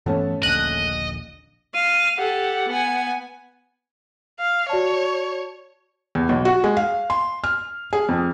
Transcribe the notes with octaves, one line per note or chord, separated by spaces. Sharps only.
G2 E3 A3 B3 C#4 A4
D#1 A#1 D3 D#5 F#6
F5 D#7
G4 A4 F#5
B3 G#5
F5
F#4 C#5 D5 A5
E2
B1
F#4
G#3
F5
C6
F6
G#4
F2